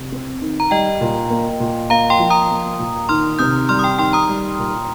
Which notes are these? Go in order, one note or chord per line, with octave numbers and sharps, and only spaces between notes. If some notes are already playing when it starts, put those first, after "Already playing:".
Already playing: C3
C4
D#3
A#5
G3 D#5 G5
A#2
A#3
A#2
A#3 F5 A#5
G5 C6
F3
A#5 D#6
A#3
A#2
D#3 C6 F6
C3 D#6 G6
G3 C6 F6
D#6
G5 C6
D#3 G5 C6
A#5 D#6
G3
A#2